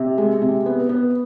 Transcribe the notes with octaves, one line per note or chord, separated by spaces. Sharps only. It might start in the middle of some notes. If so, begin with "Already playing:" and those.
Already playing: C3
G#3
C3
B3
B3